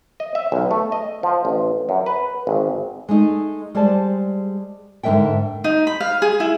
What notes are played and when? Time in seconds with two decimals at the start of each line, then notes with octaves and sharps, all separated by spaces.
0.20 D#5
0.35 E5
0.52 B1
0.71 A3
0.92 D#5
1.23 F3
1.45 A1
1.89 F#2
2.06 B4
2.47 G#1
3.09 G#3 A3 D#4
3.75 G3 G#3 G#4 C5 D5 A5
5.03 G#2 D3 G#3 A#4 E5 G5
5.64 D#4
5.87 B5
6.00 F5
6.22 G#4
6.40 E4